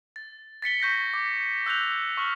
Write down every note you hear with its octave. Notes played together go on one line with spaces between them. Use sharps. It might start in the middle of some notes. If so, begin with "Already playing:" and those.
A6
A6 B6 C#7 G7
C#6 G6 A#6 B6
D6
E6 F#6 G6 F7
C#6 F6 F#7